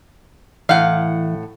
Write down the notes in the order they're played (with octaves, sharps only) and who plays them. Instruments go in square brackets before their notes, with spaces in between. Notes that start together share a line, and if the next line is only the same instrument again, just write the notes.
[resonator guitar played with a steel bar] A2 F#5 [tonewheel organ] E3 [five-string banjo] F5